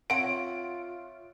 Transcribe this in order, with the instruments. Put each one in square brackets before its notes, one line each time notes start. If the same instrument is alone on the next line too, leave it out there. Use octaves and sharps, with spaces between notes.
[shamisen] C4 F#5 [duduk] F4 [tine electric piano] C#5 E5 [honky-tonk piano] D7